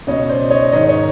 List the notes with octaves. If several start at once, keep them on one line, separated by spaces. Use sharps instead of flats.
C#2 B2 C#5 D#5
C5 D5
C#5 D#5
G#2 D#3 C#5 D#5
C#5 D#5